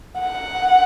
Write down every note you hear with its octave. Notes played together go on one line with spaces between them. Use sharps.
F#5